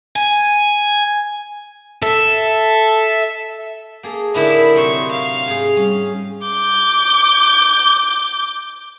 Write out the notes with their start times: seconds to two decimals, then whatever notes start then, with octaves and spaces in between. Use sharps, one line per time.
0.16 G#5
2.03 A4 E5
4.03 A#3 G#4 A4
4.35 A2 D3 D#4 E4 A#4 D5 B5
4.75 C3 F#3 D#4 C6 C#6
5.11 F5
5.47 G#2 G#4
5.77 G3 C#4
6.46 D6 G6